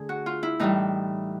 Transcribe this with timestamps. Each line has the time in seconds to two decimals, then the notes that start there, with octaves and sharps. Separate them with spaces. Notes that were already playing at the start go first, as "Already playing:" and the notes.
Already playing: D3 A3 G#4
0.09 F#4
0.26 F4
0.43 E4
0.59 A2 E3 G3 D#4